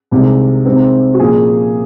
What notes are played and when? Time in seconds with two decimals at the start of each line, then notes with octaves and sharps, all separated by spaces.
0.11 C2 C3 D#3 G#3
0.66 C3 D#3 G#3 C4
1.14 F#4
1.20 A#2 F3 A#3 C#4 G#4